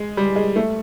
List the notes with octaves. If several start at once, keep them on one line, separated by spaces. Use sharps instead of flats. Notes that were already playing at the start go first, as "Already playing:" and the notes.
Already playing: G#3
G3
G#3
A3